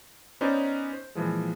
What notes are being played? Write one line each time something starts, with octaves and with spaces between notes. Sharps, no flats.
B3 C#4 D#4 B4 C5 D5
C5
A#2 E3 F3 G#3